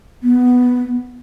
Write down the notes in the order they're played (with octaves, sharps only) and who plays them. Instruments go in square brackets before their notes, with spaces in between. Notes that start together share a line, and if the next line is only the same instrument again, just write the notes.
[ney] B3